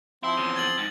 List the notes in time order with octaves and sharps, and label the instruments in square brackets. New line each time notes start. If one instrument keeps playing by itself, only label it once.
[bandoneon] F3 C4 C6 [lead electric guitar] E4
[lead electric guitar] E2 C#3
[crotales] G#6 A6 F#7
[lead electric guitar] G#2